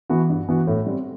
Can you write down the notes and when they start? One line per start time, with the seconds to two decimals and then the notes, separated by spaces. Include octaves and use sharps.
0.10 E3 B3 F#4
0.30 G2
0.48 E3 B3 F#4
0.67 A2
0.86 G3 C4